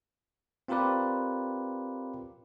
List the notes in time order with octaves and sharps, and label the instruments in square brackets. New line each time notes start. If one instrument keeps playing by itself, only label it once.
[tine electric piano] C4 F4 G4 A#4 B4 D5